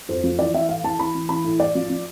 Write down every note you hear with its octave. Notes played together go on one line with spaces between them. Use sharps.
F2 C5
F3
E3 D5
E3 E5
A2 F5
E3 A5
E3 B5
E3
E3 B5
A2
A2 D5
F3
F3